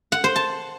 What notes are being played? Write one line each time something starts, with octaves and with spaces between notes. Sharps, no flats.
F#5
C5
A5